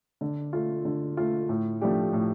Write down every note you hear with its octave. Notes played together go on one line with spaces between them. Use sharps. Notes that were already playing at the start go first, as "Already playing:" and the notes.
D3
A3 F4
D3
A3 F4
A2
F3 A3 D4 G4
A2